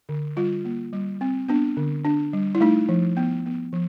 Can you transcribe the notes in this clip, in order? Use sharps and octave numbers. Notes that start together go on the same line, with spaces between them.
D3
G3 F4
A#3
G3
C4
B3 D4
D3
D4
G3
E4
A3 D#4
F3
B3
B3
F3